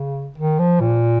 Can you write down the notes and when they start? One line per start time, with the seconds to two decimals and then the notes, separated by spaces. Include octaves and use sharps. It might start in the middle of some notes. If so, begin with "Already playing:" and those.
Already playing: C#3
0.38 D#3
0.59 F3
0.80 A#2